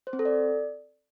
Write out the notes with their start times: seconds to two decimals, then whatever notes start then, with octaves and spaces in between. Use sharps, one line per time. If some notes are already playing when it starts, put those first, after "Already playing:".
0.07 C5
0.13 C4
0.19 A4
0.25 D5